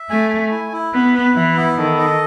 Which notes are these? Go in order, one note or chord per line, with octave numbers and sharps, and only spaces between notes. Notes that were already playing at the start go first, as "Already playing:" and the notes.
Already playing: E5
A3 G#5
G#5
E4
E4
B3 B4
B4
E3 E4
B3
D#3 A4
D#5